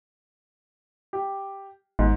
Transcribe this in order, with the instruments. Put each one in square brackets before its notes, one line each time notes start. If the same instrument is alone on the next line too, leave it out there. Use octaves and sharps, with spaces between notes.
[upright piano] G4
[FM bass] G#1 [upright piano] G#2